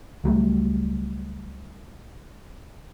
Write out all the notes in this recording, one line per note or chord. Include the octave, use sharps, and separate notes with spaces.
C#2 F#3 G3 A3